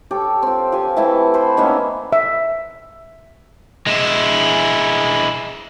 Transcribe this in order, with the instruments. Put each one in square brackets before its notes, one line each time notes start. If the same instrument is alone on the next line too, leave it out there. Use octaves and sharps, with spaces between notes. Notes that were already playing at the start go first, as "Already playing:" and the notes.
[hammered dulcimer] G4 A4 C#5
C4 F4
F3 G4 G#5
E3 A3 E4 A5
A4 B4 C5
D#3 A#3 B3 C#4
[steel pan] E5
[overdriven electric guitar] G#3 E4